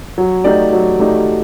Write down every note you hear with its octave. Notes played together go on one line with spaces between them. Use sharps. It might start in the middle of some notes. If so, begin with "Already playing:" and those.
F#3
A3 D#4 G4 D5
F#3
A3 D#4 G4 D5